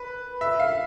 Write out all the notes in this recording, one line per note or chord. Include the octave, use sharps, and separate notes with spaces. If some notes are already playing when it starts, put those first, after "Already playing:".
Already playing: B4
E5
F5